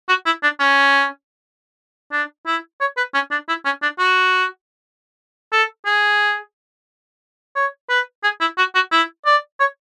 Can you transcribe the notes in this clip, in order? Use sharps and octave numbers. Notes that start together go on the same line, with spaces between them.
F#4
E4
D4
C#4
D4
E4
C#5
B4
C#4
D4
E4
C#4
D4
F#4
A4
G#4
C#5
B4
G#4
E4
F#4
F#4
E4
D5
C#5